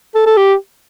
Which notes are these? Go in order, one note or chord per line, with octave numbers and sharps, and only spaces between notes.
A4
A4
G4